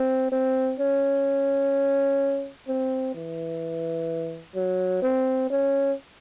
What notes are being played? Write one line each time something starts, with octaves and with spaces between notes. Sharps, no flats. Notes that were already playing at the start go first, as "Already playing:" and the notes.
Already playing: C4
C4
C#4
C4
E3
F#3
C4
C#4